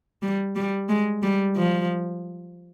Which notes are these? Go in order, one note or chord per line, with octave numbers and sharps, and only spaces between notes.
G3
G3
G#3
G3
F3